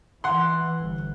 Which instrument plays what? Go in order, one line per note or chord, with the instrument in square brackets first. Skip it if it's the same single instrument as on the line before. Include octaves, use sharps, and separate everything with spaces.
[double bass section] E3 [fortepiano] F#5 C6
[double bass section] G1